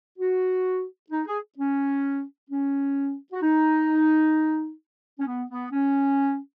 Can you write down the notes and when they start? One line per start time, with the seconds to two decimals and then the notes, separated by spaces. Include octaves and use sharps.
0.19 F#4
1.11 D#4
1.27 G#4
1.58 C#4
2.50 C#4
3.32 F#4
3.42 D#4
5.19 C#4
5.26 B3
5.49 B3
5.72 C#4